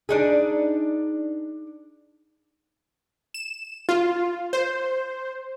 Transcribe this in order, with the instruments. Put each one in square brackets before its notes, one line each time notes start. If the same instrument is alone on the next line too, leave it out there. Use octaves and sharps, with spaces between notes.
[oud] D4 D#4 G#4
[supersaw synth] E7
F4
C5